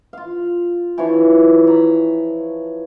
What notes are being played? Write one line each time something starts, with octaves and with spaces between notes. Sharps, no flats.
F4 F5
E3 F3 D4 C#5
A#5 B5